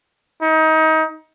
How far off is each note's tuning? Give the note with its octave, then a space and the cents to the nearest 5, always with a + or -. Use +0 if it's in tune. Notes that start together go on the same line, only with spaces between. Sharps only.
D#4 +25